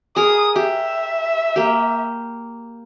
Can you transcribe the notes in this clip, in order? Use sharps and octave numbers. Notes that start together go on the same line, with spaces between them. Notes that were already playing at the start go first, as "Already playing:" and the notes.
G#4 A#4 D#6
G4 E5
A#3 G4